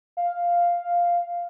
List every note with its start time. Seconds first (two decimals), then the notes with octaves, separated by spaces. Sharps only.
0.17 F5